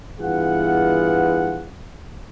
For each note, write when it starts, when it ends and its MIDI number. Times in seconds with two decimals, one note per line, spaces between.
0.20 1.68 43
0.20 1.68 52
0.20 1.68 59
0.20 1.68 65
0.20 1.68 68
0.20 1.68 78